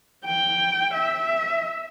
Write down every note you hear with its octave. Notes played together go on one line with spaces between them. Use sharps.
G5
E5